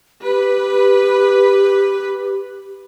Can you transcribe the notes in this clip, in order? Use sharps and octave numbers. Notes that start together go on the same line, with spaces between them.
G4 B4